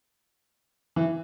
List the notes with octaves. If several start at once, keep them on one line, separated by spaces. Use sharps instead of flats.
E3